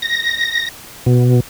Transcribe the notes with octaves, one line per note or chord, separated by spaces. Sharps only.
A#6
B2